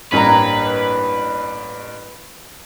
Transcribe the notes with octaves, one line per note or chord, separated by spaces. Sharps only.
A1 G2 A#3 B4 C#5 G5 A#5